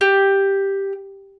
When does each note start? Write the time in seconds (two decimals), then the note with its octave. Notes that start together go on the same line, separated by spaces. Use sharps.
0.01 G4